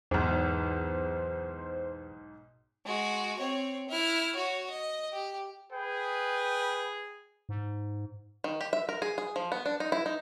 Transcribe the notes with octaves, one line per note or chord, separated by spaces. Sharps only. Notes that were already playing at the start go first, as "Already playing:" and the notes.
B1 E2 G#2 C5
G#3 F#4
C4 C#5
E4 F6
F#4 C#5
D#5
G4
G#4 B4 G5
G#2
D#3
G4
E5
A#4
G#4
G#4
F3
B3
D4
D#4
E4
D#4